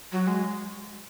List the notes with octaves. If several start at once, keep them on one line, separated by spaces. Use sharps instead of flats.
F#3
G#3